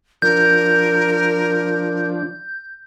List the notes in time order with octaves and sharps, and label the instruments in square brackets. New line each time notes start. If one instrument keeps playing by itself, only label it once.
[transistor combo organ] F3 D4 [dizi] A#4 [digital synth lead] G6